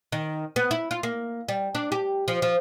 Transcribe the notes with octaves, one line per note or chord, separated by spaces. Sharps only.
D#3
B3
E4
F4
A#3
G3
D4
G4
F3
F3